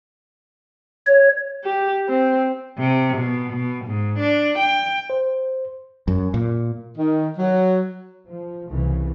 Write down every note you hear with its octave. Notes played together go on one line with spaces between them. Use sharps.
C#5
G4
C4
C3
B2
B2
G#2
D4
G5
C5
F#2
A#2
D#3
F#3
F3
C2 C#3 E3